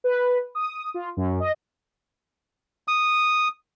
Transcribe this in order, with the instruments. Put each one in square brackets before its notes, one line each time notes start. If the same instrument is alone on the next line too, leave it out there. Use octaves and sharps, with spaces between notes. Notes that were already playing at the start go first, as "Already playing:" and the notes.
[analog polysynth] B4
D#6
F4
F#2
D#5
[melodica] D#6